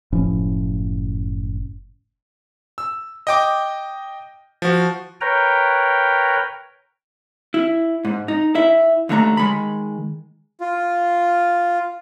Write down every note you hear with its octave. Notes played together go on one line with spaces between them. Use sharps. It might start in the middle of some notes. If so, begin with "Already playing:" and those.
F#1 A2 F3 C#4
E6
D#5 G5 D6
F3 F#4
A#4 B4 C#5 G5 A#5
E4
G#2
D#4
E4 E5
D#2 D3 A3 A#5
D#3 G#3 B5
F4